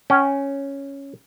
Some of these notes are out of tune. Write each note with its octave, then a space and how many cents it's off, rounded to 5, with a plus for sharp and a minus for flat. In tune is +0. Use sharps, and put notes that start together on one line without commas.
C#4 +0 G5 -30